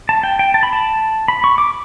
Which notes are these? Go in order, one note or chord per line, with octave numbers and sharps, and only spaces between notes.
A5
G5
G5
A5
B5
A5
B5
C#6
D6